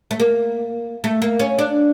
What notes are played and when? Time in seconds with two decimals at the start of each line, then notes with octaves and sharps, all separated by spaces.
0.11 A3
0.20 A#3
1.04 A3
1.22 A#3
1.40 C#4
1.59 D4